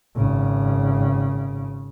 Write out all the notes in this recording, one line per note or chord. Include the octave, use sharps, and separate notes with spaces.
G#1 C#3